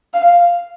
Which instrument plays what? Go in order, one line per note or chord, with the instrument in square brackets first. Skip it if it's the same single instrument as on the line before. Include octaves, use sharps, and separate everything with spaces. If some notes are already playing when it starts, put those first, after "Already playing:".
[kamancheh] F5